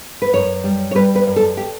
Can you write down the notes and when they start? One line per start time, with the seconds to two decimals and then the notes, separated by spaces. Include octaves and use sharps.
0.22 B4
0.33 F#2 C#5
0.64 G3
0.91 C#5
0.95 G3 B4
1.15 B4
1.27 F#2
1.36 A4
1.57 G4